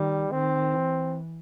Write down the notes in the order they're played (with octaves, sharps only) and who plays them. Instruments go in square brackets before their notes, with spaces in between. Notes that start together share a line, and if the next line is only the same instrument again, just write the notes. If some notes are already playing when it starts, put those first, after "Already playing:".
Already playing: [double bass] D#3 [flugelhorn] G3
[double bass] D#3 [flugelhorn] C4
[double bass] E3